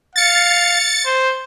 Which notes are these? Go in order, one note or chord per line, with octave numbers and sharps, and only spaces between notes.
F5 A6 C#7
C5